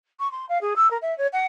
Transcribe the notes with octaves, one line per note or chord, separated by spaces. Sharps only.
C#6
C6
F5
G#4
E6
A#4
E5
C#5
F#5